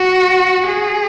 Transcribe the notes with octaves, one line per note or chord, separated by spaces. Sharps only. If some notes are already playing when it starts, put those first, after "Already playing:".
Already playing: F#4
G#4